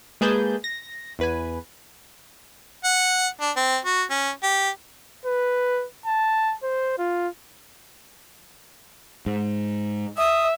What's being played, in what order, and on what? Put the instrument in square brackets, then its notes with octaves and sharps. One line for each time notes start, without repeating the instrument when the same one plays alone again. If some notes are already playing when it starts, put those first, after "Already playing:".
[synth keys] G#3 A#3 G#4 B4 A5 G6
A#6
E2 B4 G#5
[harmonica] F#5
D4
C4
F#4
C#4
G4
[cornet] B4
A5
C5
F4
[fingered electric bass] G#2
[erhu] E5 [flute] D#6